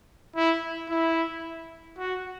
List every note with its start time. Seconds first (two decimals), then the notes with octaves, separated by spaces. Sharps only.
0.36 E4
0.90 E4
1.98 F#4